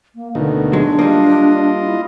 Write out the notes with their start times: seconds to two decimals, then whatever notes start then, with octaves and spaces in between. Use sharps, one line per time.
0.15 A#3
0.35 D2 B2 D3 D#3
0.73 F#3 G#3 D4
0.99 G3 A#3 F4 D#5
1.83 E4